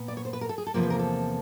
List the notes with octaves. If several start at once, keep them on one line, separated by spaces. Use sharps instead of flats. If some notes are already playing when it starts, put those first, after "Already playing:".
Already playing: A#2 B3
D5
C#5
C5
B4
A#4
A4
G#4
A4
E2 C3 F3 A#3 A#4
B4
A#4
A4